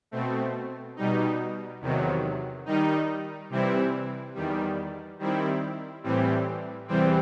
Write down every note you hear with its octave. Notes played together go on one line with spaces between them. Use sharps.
B2 A3 C4
B2 G3 D#4
E2 C3 D#3 F#3
D#3 G3 D#4
C3 E3 G3 C4 E4
E2 D#3 G3
D#3 G3 C4 E4
A2 E3 G3 C4
E2 C3 E3 G3 C4